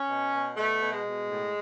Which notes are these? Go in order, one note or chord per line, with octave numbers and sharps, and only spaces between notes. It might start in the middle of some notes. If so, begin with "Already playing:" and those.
Already playing: C#4
B2
B2
B2 A3
B2
G#3
B2
A2